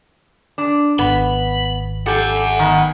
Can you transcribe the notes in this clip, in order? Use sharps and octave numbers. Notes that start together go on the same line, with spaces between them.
D4
G#1 B3 B5
G4 A4 F#5 G#5
D#3 B3